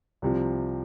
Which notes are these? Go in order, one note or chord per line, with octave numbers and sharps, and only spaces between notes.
C2 C3 F3